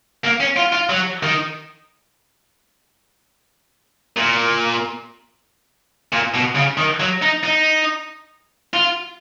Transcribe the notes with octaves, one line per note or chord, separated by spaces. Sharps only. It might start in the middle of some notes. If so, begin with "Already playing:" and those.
A#3
C#4
F4
F4
F#3
D#3
A#2
A#2
B2
C#3
D#3
F#3
D#4
D#4
F4